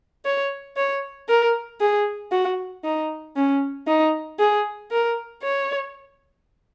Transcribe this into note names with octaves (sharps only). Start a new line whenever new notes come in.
C#5
C#5
A#4
G#4
F#4
D#4
C#4
D#4
G#4
A#4
C#5